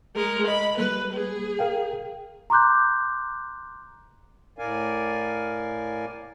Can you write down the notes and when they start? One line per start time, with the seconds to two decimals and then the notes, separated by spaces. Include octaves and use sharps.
0.15 G#3 A#4
0.48 D#5 B5
0.78 G3 A#3 B4
1.13 G#4
1.59 A#4 F5 G5
2.50 A#5 C6 D6 F#6 G6
4.58 A2 A#4 D5 F5 G#5